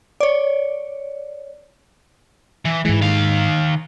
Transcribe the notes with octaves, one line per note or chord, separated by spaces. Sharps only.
C#5 D5
E3
G#2 E3 G#3
D#3 F5